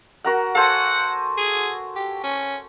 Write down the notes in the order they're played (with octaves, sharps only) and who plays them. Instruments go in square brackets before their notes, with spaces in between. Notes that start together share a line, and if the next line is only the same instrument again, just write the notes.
[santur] F#4 A#4 F#5
[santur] A4 C5 G#5 [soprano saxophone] F#5
[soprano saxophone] G#4
G4
C#4